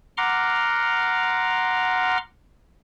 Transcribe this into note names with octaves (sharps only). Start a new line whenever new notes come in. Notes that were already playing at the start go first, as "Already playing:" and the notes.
F#5 A#5 C6 D6 F6